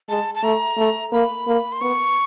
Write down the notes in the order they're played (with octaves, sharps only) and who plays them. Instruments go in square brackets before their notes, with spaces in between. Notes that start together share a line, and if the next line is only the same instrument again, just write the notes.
[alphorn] G#3 [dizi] A5
[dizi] A5
[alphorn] A3 [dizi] A#5
[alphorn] A3
[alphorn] A#3 [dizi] B5
[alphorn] A#3
[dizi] C6
[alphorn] B3 [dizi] C#6